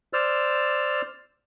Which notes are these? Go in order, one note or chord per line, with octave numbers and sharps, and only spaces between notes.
C5 D5 E6 F6